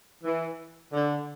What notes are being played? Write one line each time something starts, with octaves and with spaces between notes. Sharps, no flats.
E3
D3